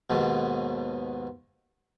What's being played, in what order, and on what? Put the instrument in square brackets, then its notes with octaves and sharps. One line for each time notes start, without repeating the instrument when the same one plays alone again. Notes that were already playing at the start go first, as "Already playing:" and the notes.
[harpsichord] D#2 G#2 B2